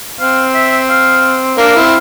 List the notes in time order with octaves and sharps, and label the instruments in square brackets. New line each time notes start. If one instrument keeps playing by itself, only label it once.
[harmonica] C4 [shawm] F5
[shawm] E5
F5
[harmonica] A#3 D4 [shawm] F5
[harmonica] C4 E4